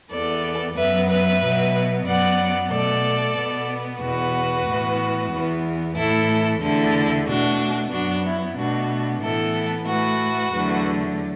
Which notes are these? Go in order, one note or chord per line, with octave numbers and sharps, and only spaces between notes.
E2 E3 B3 A4 D5
F#2 F#3 B3 B4 E5
B4 E5
B2 F#3 B3
F#2 F#3 B3 D5 F#5
B2 A3 A4 D5
B2 B3
E2 B2 B3 F#4 B4
A2 E3 B3
E2 E3 B3
A2 E3 A3 E4 A4
E2 D3 A3 E4 A4
B2 A3 D4 F#4
F#2 F#3 B3 D4 F#4
E4
B2 A3 D4 F#4
A2 E3 B3 E4 A4
A2 A3 F#4 B4
E2 D3 F#3 A3